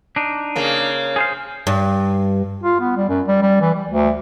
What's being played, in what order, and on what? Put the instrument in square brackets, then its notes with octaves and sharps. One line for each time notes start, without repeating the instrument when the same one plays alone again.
[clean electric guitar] D4 D#4
[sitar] C#3 A#3
[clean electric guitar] G#4 C5 F5
[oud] G2
[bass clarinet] F4
B3
G3
F#2
G3
G3
E3
G3
D2